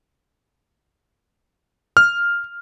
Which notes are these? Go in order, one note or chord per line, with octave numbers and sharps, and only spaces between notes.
F6